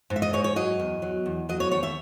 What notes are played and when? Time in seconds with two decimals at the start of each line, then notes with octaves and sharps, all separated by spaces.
0.10 G#2
0.16 E5
0.22 D#5
0.33 G#2 C#5
0.44 C#5
0.56 F#3 D#5
0.80 E2
1.02 F#3
1.26 E2
1.49 F#3 D#5
1.60 C#5
1.71 D#2 C#5
1.83 E5